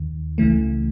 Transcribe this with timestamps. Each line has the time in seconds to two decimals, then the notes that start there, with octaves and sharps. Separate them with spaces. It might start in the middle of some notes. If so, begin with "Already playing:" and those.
Already playing: D#2 D#3
0.38 C#2 C#3 E3 A3